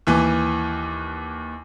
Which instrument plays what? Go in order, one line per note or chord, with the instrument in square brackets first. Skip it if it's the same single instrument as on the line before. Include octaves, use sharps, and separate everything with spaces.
[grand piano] D#2 E3